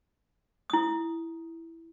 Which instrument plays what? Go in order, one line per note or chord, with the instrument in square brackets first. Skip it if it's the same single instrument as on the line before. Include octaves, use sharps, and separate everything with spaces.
[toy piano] E4 D#6